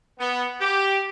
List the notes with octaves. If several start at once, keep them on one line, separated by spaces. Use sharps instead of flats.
B3
G4